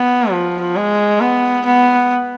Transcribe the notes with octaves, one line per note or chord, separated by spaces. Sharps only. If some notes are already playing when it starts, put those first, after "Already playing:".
Already playing: B3
F3
G#3
B3
B3